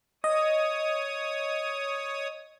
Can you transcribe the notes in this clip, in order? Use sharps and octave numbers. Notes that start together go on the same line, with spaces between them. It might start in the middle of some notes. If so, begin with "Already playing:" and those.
C#5 D#5 D#6